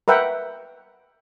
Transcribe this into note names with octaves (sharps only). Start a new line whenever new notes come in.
A#4 B4 E5 F#5 G5